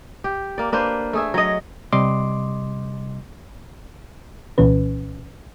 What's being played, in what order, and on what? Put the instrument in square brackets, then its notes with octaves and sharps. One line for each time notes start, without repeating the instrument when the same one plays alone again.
[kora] G4
A#3 D5
A#3 D4 B4 C5
A3 G#4 E5
F#3 D#5
[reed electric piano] C3 G3 D#5 C6 D6
[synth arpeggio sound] C2 A#2 E3 C#4 B4